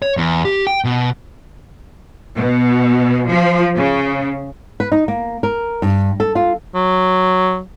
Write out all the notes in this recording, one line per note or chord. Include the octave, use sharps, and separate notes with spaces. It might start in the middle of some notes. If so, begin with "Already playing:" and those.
C#5
E2
G4
G5
B2
B2
F3
C#3
B4
D#4
A#3
A#4
G2
A4
F4
F#3